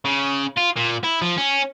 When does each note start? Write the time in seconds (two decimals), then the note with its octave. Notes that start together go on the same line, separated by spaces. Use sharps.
0.05 C#3
0.57 F4
0.77 A#2
1.04 E4
1.22 F3
1.38 C#4